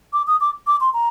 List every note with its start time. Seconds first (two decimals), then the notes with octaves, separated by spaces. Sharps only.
0.13 D6
0.27 D#6
0.41 D6
0.67 D6
0.81 C6
0.94 A#5